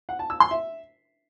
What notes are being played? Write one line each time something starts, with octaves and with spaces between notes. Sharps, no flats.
F#5
A5
E6
C6
E5